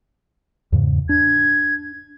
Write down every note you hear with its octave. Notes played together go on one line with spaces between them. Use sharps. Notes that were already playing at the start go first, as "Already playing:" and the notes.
E2 G#2 C#3
D4 G#6